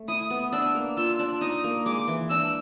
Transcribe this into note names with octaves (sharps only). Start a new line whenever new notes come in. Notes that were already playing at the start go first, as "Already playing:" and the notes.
Already playing: A3
E4 D#6
B3
D4 E6
A#3
F4 E6
D4
D#4 D#6
A#3
G#3 D6
E3
D4 E6